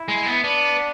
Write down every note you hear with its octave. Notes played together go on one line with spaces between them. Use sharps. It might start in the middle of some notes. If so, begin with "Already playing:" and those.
Already playing: E4
G#3
B3
B3 D4